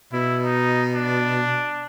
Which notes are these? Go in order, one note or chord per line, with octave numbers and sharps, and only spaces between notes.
B2 E4
D#4
D4